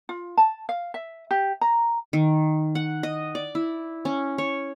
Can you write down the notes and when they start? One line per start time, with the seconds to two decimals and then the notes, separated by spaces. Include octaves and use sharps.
0.09 F4
0.37 A5
0.69 F5
0.94 E5
1.31 G4
1.61 A#5
2.13 D#3
2.75 F#5
3.03 D#5
3.35 D5
3.55 E4
4.05 C#4
4.38 C#5